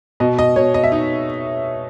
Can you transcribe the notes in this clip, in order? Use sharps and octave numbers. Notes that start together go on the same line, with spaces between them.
B2 D#5
D#5
B2 C#5
D#5
E5
D#4